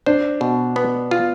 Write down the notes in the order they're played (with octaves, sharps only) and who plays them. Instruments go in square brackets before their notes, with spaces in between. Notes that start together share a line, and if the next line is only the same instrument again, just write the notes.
[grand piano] D4 [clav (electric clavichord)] C5
[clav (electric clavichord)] B2
B3
F4